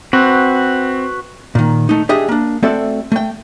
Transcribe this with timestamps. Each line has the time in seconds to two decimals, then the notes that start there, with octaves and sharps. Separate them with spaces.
0.13 C4 F#4 B4
1.55 A#2 D#3
1.89 A3 D#4
2.09 D4 G4 G#4 D#5 E5
2.29 A#3 D4
2.63 A3 C4 F#4 A4 D5 E5
3.12 A3 G5